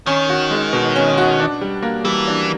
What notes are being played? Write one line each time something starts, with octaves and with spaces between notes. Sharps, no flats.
D#3 C#4
F#4
G#3
B2
C#4
F#4
D4
G3
A#3
E3 G3
D4